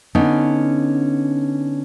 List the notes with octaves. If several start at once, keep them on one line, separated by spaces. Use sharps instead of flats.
D3 B3 C#4 D#4